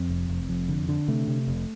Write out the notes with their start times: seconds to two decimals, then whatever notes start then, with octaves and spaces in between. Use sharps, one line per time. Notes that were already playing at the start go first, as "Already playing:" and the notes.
Already playing: F2 C4
0.09 F1
0.29 F1
0.49 F2
0.69 D3
0.89 D3
1.08 C3 A3
1.28 C3
1.48 F1